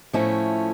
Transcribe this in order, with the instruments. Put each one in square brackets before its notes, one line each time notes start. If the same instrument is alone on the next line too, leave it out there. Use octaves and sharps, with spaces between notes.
[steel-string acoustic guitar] A2 F3 A3 C#4 E4